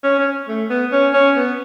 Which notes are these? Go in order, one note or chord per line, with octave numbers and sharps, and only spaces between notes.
C#4
C#4
A3
B3
C#4
C#4
B3